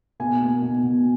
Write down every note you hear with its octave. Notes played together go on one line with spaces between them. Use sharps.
B2 G#5
A#3
B2
B2